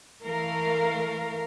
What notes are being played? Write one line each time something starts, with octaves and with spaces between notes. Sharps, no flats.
E3 A3 A#4 F5